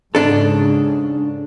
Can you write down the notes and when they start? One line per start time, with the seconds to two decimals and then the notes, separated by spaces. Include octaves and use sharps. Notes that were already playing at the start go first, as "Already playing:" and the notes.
0.15 G#2 C#3 D4 A4